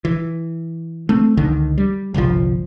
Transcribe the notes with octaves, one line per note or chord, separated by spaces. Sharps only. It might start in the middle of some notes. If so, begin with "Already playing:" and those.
E3
A3 C4
C#2 D3 D#3
G3
G1 C2 B2 F3